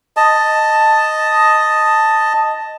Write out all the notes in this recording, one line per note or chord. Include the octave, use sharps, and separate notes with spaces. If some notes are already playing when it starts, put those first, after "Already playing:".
D#5 A5